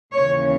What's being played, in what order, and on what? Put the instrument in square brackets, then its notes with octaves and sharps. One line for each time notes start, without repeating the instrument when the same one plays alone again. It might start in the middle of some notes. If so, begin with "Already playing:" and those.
[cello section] D#2 C#3 E3 C#5